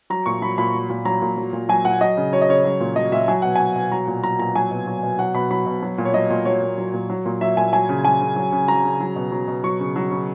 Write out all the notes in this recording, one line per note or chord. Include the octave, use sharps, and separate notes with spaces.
F#3 A#5
A#2 C#6
F#3 B5
A#2 B5
F#3
A#2
F#3 A#5
A#2
F#3
A#2
F#3 G#5
A#2 F#5
F#3 D#5
C#3
F#3 C#5
D#5
C#3 C#5
F#3
A#2
F#3 D#5
A#2 E5
F#3 G#5
B2 F#5
F#3 G#5
B2
F#3 A#5
A#2
F#3 A#5
A#2 A#5
F#3 G#5
B2
F#3
B2
F#3 F#5
B2 B5
F#3 B5
B2
F#3
A#2
C#5
F#3 D#5
A#2
F#3 C#5
A#2
F#3
A#2
F#3
A#2
F#3 E5
A#2 G#5
F#3 G#5
C#3
F#3 G#5
C#3
F#3
C#3
F#3 A#5
C#3
F#3
B2
F#3
B2
F#3 C#6
C#3
F#3
C#3